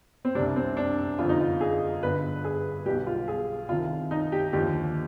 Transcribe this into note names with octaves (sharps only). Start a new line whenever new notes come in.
C4
C2 C3 G3 D4
C4
D4
G1 F2 D3 F3 F4
D#4
F4
G#4
G1 G2 D3 B4
G#4
B1 B2 G3 G4
F4
G#4
C2 C3 D#3 F4
D#4
G4
D#2 D3 F3 G4